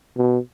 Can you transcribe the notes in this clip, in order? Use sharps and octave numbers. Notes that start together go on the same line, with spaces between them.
B2